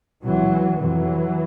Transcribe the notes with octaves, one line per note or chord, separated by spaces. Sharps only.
C#2 C3 E3 F#3
F2 C3 E3 F#3